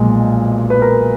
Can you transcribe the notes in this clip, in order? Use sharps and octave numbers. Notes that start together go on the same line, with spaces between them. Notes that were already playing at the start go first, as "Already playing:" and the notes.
Already playing: B1 A#2 F3 G#3
B4
A#4